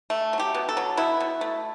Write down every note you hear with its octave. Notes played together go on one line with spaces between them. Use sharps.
A3
F#3
G4
B2
A4
F#3
B2 E4
B2
A3